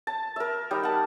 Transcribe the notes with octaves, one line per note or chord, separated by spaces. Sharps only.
A5
A#4 E5
G3 D#4
F#5 A5